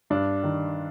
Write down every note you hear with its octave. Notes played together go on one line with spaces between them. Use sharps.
G2 D4
D#3